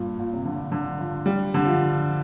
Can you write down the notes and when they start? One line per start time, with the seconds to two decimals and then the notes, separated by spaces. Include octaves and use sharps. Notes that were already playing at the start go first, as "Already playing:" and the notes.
Already playing: G2 A#2
0.19 A#2
0.33 C3
0.45 D3
0.72 D3
0.99 F3
1.26 G3
1.54 D3
1.65 F3